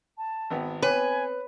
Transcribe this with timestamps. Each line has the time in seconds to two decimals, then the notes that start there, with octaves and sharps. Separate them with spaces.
0.18 A5
0.50 G#1 B3 G5
0.82 B3 C4 B4 C#5 G#5